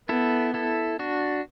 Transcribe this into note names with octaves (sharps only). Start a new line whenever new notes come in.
B3 E4 A4
E4 A4
D4 F#4